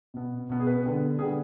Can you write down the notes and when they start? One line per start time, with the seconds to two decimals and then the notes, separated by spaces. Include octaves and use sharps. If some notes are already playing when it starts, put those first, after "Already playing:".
0.14 B2 B3
0.50 B2 B3
0.60 G#4
0.67 B4
0.83 D3 G3 B3
1.19 D3 G3 B3 G#4